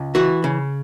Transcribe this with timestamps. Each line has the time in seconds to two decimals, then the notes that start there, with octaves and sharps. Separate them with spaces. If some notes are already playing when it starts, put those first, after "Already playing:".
Already playing: C#2
0.15 E3 F#4
0.44 C#3